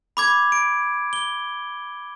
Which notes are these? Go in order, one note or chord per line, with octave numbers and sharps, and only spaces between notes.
B5 D6 G#6
D7
G7